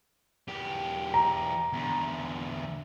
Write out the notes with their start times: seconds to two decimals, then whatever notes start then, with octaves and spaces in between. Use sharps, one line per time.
0.48 E2 G4
1.14 A#5
1.73 E2 D3